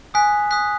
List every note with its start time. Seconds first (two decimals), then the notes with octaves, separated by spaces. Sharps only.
0.14 G#5 D#6 F#6 B6
0.51 D#6 F#6 B6